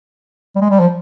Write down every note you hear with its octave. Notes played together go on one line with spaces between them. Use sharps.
G3
G#3
G3
F3